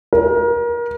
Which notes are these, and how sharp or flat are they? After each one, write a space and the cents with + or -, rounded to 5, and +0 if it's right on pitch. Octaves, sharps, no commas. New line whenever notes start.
A#4 +30